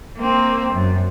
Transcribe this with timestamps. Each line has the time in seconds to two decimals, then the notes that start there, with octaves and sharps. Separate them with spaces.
0.17 A#3 C4
0.74 F#2